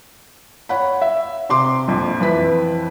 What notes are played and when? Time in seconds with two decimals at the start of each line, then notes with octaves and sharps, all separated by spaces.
0.69 C#5 F#5 B5
1.02 E5
1.50 C3 C6 D6
1.88 A#1 F2
2.20 F2 E3 B4 B6